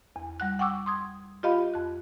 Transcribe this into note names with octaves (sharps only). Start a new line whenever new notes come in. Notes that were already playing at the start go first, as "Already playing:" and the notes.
E2
G3 F#5 F#6
F#5 G5 C#6 D6 E6
C6 D#6 G#6
F4 G4 D#5 F5 B5
F2 F#6